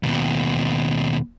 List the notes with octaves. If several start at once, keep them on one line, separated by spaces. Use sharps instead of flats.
D#2 B2